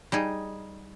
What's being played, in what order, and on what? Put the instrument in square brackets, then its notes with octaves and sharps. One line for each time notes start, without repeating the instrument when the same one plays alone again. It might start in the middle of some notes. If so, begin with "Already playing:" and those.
[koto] G3 D#4 G#4